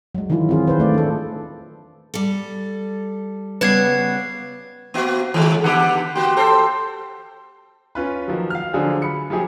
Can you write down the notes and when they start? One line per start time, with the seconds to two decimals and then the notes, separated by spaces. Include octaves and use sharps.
0.15 F#3 G#3
0.30 D#3 E3 F#3 E4 F4
0.49 C4 F4 G#4
0.68 D#3 B4 C5
0.80 A3 D5
0.94 D4 A4
2.14 G3 A4
3.61 C#3 G3 B3 B4 G#6 C7
4.94 C3 A#3 B3 F#4
5.34 F2 A2 D3 D#3 G#3
5.64 D3 B3 G4 F#5
6.15 A#3 F#4 G4 C6
6.37 A4 C5
7.95 C#4 F4 B4
8.28 D#3 F3 F#3
8.50 F5 F6
8.73 D3 F3 F#3 F4 G#4 C5
9.02 B5 C#7
9.30 F3 F#3 G4 G#4